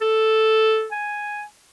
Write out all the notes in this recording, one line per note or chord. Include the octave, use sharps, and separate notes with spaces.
A4
G#5